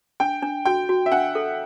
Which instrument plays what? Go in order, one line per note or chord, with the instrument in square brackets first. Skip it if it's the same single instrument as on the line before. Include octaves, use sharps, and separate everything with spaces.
[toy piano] D4 [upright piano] G5
[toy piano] D4
[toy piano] F#4 [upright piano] G5
[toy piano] F#4
[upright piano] E5
[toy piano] D4 [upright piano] F#5
[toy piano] A4